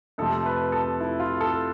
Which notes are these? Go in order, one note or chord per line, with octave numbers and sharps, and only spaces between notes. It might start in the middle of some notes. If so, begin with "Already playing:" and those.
F2 C3 F3 A3 A4
B4
A4
E4
F4
A4